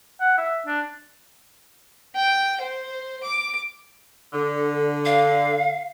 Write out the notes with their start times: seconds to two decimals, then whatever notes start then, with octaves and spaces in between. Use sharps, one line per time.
0.21 F#5
0.38 E5
0.66 D4
2.15 G5
2.61 C5
3.23 D6
4.33 D3
5.05 F5